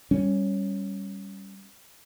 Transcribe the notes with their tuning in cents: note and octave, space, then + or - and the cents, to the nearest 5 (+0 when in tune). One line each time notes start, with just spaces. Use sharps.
G3 +0 C#4 +0